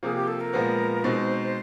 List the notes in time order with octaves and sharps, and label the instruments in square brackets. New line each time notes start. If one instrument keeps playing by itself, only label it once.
[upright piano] C3 F3 A#3 [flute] G#4
[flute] G4
A4
A#4
[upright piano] A#2 F3 G#3 B3
[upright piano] B2 G#3 C4 D#4 [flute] C5